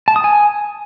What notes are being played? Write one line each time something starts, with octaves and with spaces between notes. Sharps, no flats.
A5
D#6
G#5